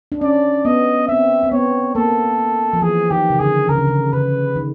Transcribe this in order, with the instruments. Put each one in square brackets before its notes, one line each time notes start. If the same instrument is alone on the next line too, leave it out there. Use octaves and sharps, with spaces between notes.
[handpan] D4
[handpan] C#4 [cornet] D5
[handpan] B3 [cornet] D#5
[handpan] C4 [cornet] E5
[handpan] C4
[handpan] B3 [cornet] C#5
[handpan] A#3 [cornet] A4
[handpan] F3
[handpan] E3 [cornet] G#4
[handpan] D#3 [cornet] G4
[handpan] C#3
[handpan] D3 [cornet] G#4
[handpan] C#3 [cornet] A#4
[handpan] D3
C#3
[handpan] C#3 [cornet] B4
[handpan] D#3